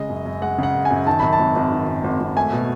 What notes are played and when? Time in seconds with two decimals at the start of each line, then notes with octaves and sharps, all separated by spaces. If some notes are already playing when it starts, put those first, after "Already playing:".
Already playing: C#3 G#3 D#5
0.09 F#2
0.26 F#2
0.42 G#3 F#5
0.58 C#3 F#5
0.74 F#2
0.85 G#5
0.91 F#2
1.07 D#3 A5
1.20 F#2 B5
1.33 A5
1.39 G#1
1.56 G#1
1.72 D#3
1.88 F#2
2.04 G#1
2.21 G#1
2.37 A3 G#5
2.53 B2